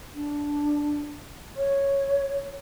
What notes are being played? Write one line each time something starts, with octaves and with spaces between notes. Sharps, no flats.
D4
C#5